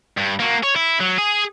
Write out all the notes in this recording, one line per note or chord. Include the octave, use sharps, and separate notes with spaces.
G2
A#3 F#4
C#5
E4
F#3
G#4